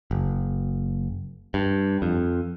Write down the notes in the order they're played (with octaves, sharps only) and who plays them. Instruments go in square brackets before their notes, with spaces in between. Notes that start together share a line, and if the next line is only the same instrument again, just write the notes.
[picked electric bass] F#1
G2
F2